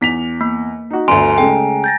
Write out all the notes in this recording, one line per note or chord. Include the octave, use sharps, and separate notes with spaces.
E2 B6 F7
A#3
D#4 F#4
G1 D2 G#5 A#5 C6 D7
C#3 G#3 A3 G5
G6 A6 A#6